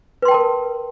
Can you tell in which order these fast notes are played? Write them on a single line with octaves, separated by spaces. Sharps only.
B4 C6 G5 A5 A#4